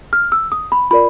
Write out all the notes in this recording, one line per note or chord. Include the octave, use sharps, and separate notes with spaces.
F6
E6
D#6
B5
F4 A#4 D5 B5